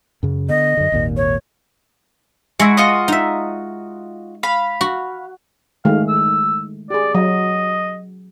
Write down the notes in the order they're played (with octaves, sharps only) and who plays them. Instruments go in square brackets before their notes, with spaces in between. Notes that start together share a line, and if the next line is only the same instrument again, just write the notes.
[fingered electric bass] F#2 C#3
[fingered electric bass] D3 B3 [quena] D#5
[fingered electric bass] F#2 D3
G#1 D#2 A#2
[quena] C#5
[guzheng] G#3 [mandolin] E4 F#4
[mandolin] F4 F#4 D#5
[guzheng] D#4 E5
[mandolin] F5 B5
[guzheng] F#4
[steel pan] D#3 G#3 A3 [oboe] F5
[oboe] E6
[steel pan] G4 G#4 [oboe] D5
[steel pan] F#3 [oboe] D#5